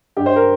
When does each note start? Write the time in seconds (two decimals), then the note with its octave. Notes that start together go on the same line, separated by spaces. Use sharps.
0.17 G2 G4
0.26 C5
0.36 A#4